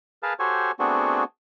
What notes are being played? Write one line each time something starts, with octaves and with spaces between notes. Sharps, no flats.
G#4 A#4 B4 F5 A5
F#4 G4 A4 C5 C#5 G#5
A3 B3 C4 D4 F#4 G#4